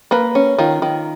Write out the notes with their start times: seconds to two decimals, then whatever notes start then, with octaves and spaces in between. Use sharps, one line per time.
0.11 A#3 B4
0.35 C#4
0.58 D#3 F4
0.82 D#3